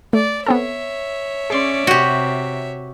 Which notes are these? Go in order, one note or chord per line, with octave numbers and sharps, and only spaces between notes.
A3 D5
B3 C4 A4 C#5 E5
C#4 G#4 D5 C6
C3 F#4 G4